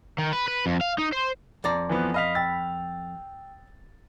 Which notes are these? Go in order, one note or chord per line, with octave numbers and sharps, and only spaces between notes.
D#3
B4
B4
F2
F5
D#4
C5
F2 D5 A#5
E3 F3 B3
D#5 F5 B5 F6 B6 F7
G5 E6 A6